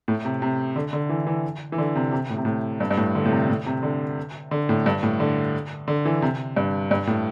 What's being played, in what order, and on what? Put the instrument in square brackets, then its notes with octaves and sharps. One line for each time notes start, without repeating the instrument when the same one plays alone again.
[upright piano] A2
C3
C3
D3
D3
E3
E3
E3
D3
C3
C3
A2
C3
A2
G2
G2
A2
D3
A2
C3
A2
C3
D3
D3
A2
G2
A2
D3
D3
E3
C3
G2
G2
A2